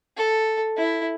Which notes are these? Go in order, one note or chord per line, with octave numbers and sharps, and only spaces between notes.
A4
E4